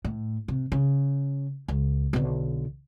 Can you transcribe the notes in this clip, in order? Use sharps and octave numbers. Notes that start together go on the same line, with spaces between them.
A2
C3
C#3
C#2
B1 D3